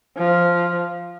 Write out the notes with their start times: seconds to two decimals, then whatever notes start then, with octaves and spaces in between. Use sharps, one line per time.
0.17 F3